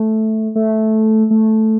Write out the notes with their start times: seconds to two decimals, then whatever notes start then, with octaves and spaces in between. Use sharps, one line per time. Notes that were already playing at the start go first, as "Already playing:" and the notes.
Already playing: A3
0.55 A3
1.30 A3